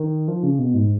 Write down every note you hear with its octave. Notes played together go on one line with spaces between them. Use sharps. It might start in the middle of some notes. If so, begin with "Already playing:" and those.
Already playing: D#3
F3
C#3
B2
G#2